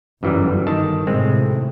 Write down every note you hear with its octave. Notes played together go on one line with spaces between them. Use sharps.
G1 F#2 E3 G3
D#3 A5
A2 C3 G#3 C4